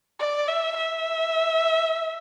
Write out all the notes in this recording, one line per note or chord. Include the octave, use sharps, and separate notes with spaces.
D5
E5
E5